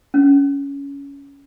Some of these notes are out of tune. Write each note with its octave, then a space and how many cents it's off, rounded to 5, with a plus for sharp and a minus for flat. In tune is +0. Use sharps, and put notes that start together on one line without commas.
C#4 +15